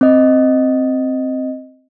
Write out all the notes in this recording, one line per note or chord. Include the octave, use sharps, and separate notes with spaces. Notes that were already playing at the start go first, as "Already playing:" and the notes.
C4 D#5